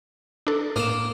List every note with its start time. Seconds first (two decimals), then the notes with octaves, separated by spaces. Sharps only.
0.47 D4 A4
0.76 A2 A#3 F5 D#6 E7